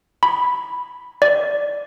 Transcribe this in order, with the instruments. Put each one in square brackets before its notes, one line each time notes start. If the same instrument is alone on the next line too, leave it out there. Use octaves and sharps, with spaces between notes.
[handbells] B5
D5